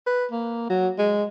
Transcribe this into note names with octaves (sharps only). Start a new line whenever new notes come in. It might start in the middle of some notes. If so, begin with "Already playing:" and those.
B4
A#3
F#3
G#3